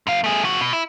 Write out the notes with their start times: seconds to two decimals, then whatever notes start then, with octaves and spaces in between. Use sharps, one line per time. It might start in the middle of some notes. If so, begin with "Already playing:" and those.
0.07 F#2 F5
0.24 A3 G#4
0.42 F2 F#4
0.61 B2
0.73 E4